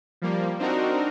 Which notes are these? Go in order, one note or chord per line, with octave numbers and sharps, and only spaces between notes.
F3 G3 A#3
C4 D4 D#4 F#4 A#4